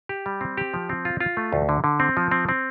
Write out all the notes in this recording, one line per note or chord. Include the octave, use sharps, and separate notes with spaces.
G4
G3
C4
G4
F3
C4
F4
F4
A3
D2
D3
D3
C4
F3
C4
C4